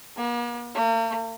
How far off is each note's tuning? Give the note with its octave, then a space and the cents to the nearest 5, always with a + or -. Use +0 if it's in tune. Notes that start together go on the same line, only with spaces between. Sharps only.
A#3 +45
A#3 -45